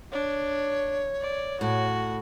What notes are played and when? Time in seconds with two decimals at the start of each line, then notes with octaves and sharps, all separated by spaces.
0.12 D4 C#5
1.21 D5
1.61 A2 F#4